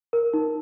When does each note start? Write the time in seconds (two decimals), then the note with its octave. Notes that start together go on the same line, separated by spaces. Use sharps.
0.13 A#4
0.34 D#4